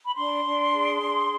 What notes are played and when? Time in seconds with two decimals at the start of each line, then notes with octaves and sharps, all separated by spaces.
0.05 B5
0.16 D4 C6
0.45 D4
0.74 G#4
1.02 D4